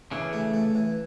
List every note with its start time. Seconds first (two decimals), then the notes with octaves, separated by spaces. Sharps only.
0.11 C#3 E3 D4
0.33 A3
0.54 A3
0.75 E3